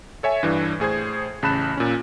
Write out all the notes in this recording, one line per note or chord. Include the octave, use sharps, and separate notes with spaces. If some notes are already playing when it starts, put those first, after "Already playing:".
A4 C#5 E5 G#5
G2 E3 D4
A2 G#4 C5 G#6
A1 C#3 A5 B5 F#6 E7
A#2 C#4